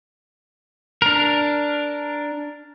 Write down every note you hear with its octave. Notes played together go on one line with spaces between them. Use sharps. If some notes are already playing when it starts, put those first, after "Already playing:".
D4 A#4